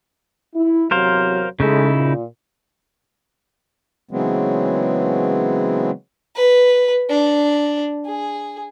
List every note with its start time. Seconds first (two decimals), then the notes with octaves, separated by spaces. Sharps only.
0.55 E4
0.91 E2 C3 F#3 A#4 C5 F5
1.60 C#3 G#3 A3 D#4 E4
1.94 A#2
4.11 C#3 E3 F#3 G#3 B3 C4
6.35 B4
7.09 D4
8.05 G#4